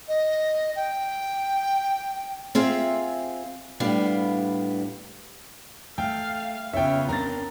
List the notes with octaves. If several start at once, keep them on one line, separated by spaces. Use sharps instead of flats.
D#5
G5
C4 F4 G#4 E5
A2 G3 B3 D4 F5
A3 F5 G5
C#3 B3 C#4 F4 C#5 E5 G5
C4 D4 A#4 A#5 A6